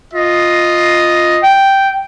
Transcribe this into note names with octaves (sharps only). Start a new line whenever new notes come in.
F4 D#5
G5